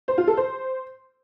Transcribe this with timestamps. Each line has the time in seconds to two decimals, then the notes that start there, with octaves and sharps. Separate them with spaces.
0.08 C5
0.18 F4
0.27 A4
0.37 C5